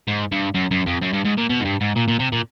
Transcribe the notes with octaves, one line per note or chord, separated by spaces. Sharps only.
G#2
G2
F#2
F#2
F2
F#2
G2
G#2
A#2
B2
G#2
G2
G#2
A#2
A#2
C3
A#2